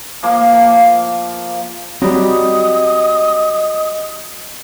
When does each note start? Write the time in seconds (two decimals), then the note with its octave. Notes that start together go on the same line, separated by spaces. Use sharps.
0.23 F3 A#3
2.02 F#3 G3 C4 G4 D#5 D#6